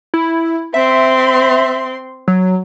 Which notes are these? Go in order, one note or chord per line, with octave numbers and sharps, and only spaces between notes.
E4
C4 E5 C6
F#3